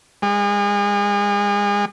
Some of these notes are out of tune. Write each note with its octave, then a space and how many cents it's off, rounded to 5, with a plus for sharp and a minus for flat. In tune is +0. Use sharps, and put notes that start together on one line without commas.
G#3 -35